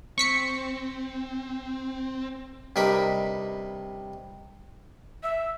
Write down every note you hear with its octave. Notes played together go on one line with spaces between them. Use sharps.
C4 C#6 B6 C#7
G2 C3 D#4 A#4 B5 D6
E5